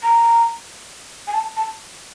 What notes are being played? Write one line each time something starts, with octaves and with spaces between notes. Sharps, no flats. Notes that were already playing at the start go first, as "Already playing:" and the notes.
A#5
G#5
A5
A5